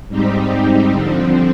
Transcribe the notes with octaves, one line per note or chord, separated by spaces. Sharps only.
G#2 G3 C4 D#4 G4
D3 F3 C4